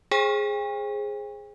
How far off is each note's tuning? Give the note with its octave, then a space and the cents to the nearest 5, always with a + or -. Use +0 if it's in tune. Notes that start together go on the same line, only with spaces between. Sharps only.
G#4 +0 C5 +30 G5 +45